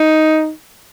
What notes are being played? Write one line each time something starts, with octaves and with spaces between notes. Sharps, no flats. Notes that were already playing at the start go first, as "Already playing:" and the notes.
Already playing: D#4